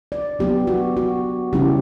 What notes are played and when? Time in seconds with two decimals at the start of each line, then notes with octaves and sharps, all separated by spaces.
0.12 D5
0.39 F#3 B3 D4 G4
0.67 F#4
0.97 F#4
1.53 C#3 G3 C#4 E4 G4